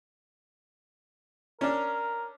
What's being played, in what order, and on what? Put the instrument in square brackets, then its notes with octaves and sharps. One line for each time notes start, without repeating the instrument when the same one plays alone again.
[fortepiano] C#4 D4 [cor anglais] A#4